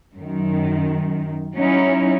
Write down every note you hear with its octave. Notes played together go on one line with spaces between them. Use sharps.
F#2 D#3
F#3 C#4 D#4 E4